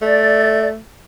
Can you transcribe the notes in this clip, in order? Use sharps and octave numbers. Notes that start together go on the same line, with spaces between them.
A3 D5